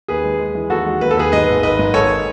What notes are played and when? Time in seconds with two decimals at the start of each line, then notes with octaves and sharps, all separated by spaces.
0.08 D#2 G#4 B4
0.24 G#3
0.39 G#3
0.55 E3
0.70 D#2 F#4 A4
0.86 G#3
1.01 D#2 B4
1.11 A4
1.17 D#2 G#4 B4
1.32 G#2 B4 D#5
1.48 G#1
1.63 G#1 B4 D#5
1.79 G#2
1.94 G#1 A4 C#5